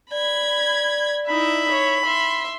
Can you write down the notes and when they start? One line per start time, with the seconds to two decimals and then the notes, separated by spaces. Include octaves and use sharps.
0.11 D5 B5 G#6
1.29 D#4 E4 E5 B5
1.71 C#5
2.05 E5 C6